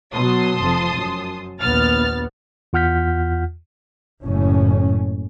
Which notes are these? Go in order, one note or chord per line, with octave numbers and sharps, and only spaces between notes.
B2 F#3 A5 C6 D#6
F1 F2 F3
F#2
A#1 D#2 B3 F6 A6
E2 F4 F#5 F6 G6 B6
F#1 A2 C#4